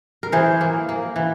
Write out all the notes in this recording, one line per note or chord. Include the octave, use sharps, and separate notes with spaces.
A#4
E3 G#4 C5
A#3
A#3
E3